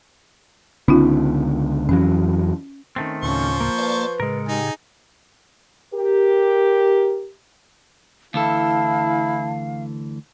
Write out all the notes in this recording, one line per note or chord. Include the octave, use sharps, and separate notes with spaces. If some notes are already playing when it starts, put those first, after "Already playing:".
C#2 D3 B3 C#4 D#4 F4
F2 E3 F#3 C#4
D#3 A3 C4 C#4
D2 A2 C#3 F3 C#4 C5 C#6
A#3
B4 D5 F5 A5
A2 C#3 G#3 A#4
D#4 G4 G#4
G4 A#4
D2 E3 E4 A4 F5 A5